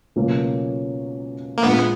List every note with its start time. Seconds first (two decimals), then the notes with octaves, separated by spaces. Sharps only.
0.16 C#2 B2 F#3 A#3 C#4
1.58 A#3
1.63 A#1 A#2 G#3 B3